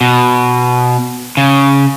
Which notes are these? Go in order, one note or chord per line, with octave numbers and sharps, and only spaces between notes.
B2
C#3